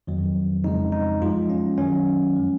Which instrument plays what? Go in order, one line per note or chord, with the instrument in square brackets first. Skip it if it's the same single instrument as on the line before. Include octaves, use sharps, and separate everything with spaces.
[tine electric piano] F2 D#3 F#3
F2 C#3 G#3 D#4
D#4
F#2 F3 G#3 F4
C#4
F#2 D#3 F#3 C#4
F3 G#3